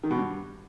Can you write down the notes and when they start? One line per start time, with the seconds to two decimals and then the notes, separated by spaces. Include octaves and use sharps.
0.03 D#3
0.11 B2
0.18 G2